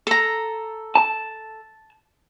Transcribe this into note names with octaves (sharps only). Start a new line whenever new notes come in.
A4 A#5
A5